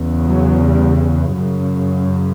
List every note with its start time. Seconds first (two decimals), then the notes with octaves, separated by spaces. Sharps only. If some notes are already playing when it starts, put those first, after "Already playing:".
Already playing: E2 C#3
0.26 F#3
0.63 G3
1.35 F#2 C#3